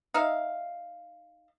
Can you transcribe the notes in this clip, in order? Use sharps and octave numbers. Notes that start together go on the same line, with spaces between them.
D#4 E5 F5